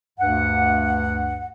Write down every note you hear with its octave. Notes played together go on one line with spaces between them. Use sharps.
D2 G2 F#5